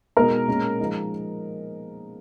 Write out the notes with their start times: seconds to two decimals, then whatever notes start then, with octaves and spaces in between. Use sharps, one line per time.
0.17 B2 G#3 D#4 A#4 A#5
0.48 A#2 G#3 C#4
0.79 F3 G#3 D#4